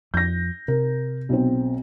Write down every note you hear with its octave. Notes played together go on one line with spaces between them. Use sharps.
F2 G6 A#6
C3 A#4
B1 C4